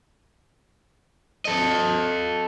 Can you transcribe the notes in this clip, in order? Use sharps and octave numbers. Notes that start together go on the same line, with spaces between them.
A4 D#5